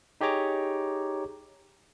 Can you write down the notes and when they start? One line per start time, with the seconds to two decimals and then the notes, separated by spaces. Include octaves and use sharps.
0.21 D#4 G4 G#4 C#5 A#5 D6